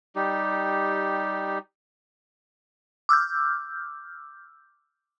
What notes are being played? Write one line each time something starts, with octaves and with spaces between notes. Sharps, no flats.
G3 D#4 G4
D6 E6 F6 G6